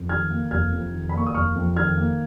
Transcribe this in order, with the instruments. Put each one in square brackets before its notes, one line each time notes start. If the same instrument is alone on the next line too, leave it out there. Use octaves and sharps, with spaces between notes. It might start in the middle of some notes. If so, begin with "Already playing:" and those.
Already playing: [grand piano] F2
D#3 F6 G#6
A#3
F1 F6 G#6
F2
D#3
B5
A#3 C#6
D#6
F1 C#6 F6
F2
D#3 F6 G#6
A#3